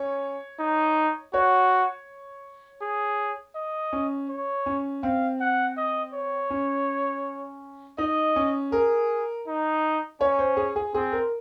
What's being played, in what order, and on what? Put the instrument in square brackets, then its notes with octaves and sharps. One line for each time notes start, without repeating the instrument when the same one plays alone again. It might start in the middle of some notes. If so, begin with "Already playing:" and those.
Already playing: [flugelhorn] C#4 [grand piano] C#5
[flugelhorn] D#4
[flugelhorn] F#4 [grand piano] C#5
[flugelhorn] G#4
D#5
[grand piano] C#4
[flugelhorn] C#5
[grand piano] C#4
[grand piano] C4 [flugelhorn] F5
[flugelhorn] F#5
D#5
C#5
[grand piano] C#4
[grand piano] D#4 [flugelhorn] D#5
[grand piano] C#4
[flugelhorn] G#4 [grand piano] A#4
[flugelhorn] D#4
[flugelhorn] C#4 [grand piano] C#5
[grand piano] C5
G#4
G#4
[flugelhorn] C4 [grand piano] G#4
[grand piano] A#4